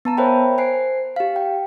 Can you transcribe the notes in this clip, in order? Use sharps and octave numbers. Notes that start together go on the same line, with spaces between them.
B3 A5 A#5
A#4 C5 C#5 E5 G5 B5
C5 G#5 C7
G4 F5
G5